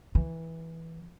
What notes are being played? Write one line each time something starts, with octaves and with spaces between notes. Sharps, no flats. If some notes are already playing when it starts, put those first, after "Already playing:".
E3